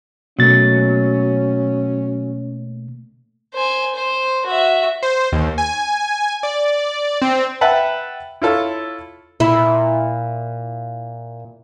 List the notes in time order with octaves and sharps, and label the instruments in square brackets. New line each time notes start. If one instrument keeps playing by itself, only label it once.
[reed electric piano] B2 A6 [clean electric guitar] F#3 [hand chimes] A3 A#3 [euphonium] C#4
[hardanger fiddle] C5 G#5
C5
F#4 E5
[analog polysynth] C5
D#2
G#5
D5
C4
[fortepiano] B4 E5 F#5 G5 A5
E4 F4 A4 C#5
[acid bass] A#2 [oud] E4